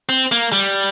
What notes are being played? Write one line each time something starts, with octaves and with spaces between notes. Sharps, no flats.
C4
A#3
G3